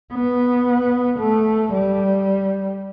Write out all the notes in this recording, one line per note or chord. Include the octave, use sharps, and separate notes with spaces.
B3
A3
G3